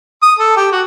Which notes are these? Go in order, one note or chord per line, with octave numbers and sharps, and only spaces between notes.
D#6
A4
G4
F#4